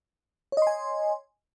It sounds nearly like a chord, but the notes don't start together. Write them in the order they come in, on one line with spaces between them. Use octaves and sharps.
C#5 D#5 C6 G#5